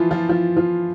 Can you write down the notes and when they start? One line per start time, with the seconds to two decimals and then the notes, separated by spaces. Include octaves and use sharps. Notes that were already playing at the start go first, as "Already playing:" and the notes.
Already playing: E3 F3 E4 F4
0.11 F3 F4
0.29 F3 F4
0.57 F3 F4